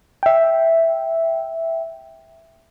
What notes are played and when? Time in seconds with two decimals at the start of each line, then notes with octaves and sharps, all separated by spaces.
0.23 E5 G5